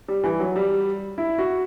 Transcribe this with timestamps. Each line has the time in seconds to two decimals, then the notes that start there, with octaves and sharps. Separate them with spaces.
0.08 G3
0.24 E3
0.40 F#3
0.56 G3
1.18 E4
1.38 F#4